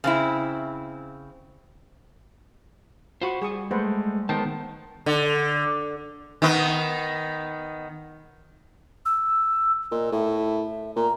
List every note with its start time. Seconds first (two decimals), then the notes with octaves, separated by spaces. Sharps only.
0.04 C#3 C4 E4
3.22 F4 F#4 C5 B5 C#6
3.42 G3 G#4 C#6 D#6
3.71 G#3 A3 B4 C5 F#5
4.29 D#3 G#3 B3 C5 G5 A5
5.06 D3
6.42 D#3 B3
9.06 E6
9.92 A#2 D#5
10.12 A2 E5
10.96 A#2 A#5